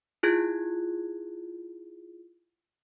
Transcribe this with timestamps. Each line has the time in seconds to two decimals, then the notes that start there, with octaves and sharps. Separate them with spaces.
0.23 E4 F4 G#4 F#6 G#6